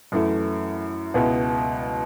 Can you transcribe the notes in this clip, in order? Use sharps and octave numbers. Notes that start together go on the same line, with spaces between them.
F#2 E3 A3 E4
C#2 B2 B3 E4